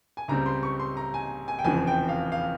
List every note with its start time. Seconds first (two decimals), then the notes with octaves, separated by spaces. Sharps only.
0.17 G#5
0.28 C#2 C#3 G3 C4 A#5
0.46 C6
0.63 C#6
0.80 C6
0.97 A#5
1.14 G#5
1.48 G#5
1.59 G5
1.64 F1 E2 C#3 F3 C4 G#5
1.87 G5
2.09 F5
2.32 F5